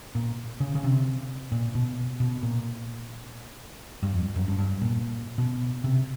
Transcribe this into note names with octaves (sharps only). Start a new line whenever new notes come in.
A#2
C#3
C#3
C3
A#2
B2
B2
A#2
G2
F2
F#2
G2
G2
A#2
B2
C3